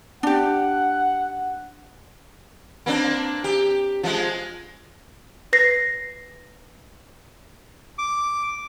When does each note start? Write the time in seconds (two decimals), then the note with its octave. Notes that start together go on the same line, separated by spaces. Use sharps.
0.23 D4 G4 F#5
2.86 A#3 C4 D4
3.44 G4
4.03 F3 G#3
5.53 B4 A#6 C7
7.98 D6